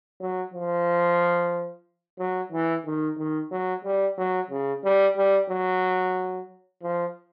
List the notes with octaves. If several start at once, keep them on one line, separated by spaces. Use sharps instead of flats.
F#3
F3
F#3
E3
D#3
D#3
F#3
G3
F#3
C#3
G3
G3
F#3
F3